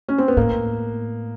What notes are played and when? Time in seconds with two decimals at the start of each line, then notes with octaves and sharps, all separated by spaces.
0.08 C#4
0.18 C4
0.28 B3
0.37 A2 A#3